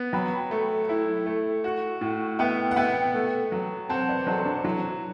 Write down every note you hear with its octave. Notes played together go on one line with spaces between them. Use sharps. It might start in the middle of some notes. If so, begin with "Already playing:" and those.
Already playing: B3
F#3 G5 B5
A3
E4
A3
F#4
A2
B3 E5 G5
F#5
B3 E5 G5
A3
F#3
C4 F#5 A5
B4 D5
F#3 A4 C5
D4
D4
F#3 E4